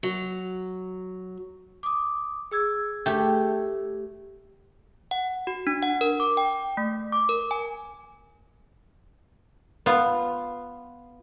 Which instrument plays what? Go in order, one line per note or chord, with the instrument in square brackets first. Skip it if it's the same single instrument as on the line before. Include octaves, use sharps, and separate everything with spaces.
[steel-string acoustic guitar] F#3
[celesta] D6 D#6
G#4 E6 G#6
[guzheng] A3 G4
[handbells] F#5
F#4
D4
F#5
A#4
D6
G5
A3
D6
A#4
G#5
[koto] B3 F4